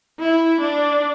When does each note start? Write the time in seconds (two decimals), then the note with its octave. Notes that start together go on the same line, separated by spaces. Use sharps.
0.20 E4
0.60 D4